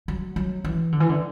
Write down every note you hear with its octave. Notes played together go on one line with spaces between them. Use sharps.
F#3
F#3
E3
D3
E3
D3